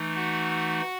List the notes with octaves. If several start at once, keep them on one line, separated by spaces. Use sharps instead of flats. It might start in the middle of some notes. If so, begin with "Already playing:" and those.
Already playing: E3 A3 D#4
F#4 F#5